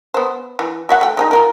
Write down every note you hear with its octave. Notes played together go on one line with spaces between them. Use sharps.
B3 C5
E3
F#4 E5 F#5
A3 G5
G#3 C#4 D#4
F4 F#4 A#4